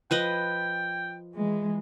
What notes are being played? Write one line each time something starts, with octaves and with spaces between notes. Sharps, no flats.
F3 B4 D#5 G5
E3 G#3